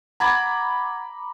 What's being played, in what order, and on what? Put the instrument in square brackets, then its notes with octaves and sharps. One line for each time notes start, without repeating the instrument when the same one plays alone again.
[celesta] F#5 G#6 A6 [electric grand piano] A#5 B5 D6